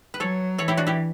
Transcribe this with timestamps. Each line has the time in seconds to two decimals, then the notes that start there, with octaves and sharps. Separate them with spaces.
0.14 B4
0.20 F#3 A4 C#5
0.58 E3 A4 C#5
0.68 E4 G4
0.77 D4 F#4
0.87 E4 G4